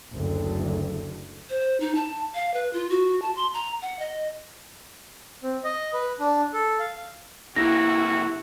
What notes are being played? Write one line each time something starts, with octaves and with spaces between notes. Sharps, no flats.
F#1 D2 D3
C5
D#4
A5
F5
B4
F4
F#4
A5
C6
A#5
F#5
D#5
C4
D#5
B4
D4
A4
F5
C3 A#3 E4 F#4 G4 A#6